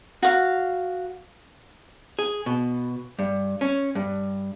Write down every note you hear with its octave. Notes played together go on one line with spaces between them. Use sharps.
F#4 F5
G#4
B2
G2
C#4
G2